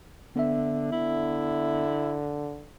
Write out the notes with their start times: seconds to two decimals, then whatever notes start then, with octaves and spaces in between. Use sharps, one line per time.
0.36 D3 B3 E5
0.92 D3 E4